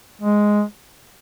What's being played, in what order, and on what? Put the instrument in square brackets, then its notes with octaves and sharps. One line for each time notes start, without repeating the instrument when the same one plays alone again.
[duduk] G#3